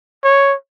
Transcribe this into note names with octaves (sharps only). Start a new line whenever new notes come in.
C#5